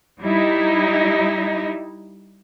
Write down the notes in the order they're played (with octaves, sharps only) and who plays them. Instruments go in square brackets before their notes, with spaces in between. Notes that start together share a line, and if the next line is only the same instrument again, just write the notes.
[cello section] G3 D#4 E4